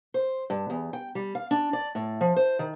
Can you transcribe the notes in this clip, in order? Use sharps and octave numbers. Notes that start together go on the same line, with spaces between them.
C5
G2
E2
G5
G3
F5
D4
D5
A2
F3
C5
D#3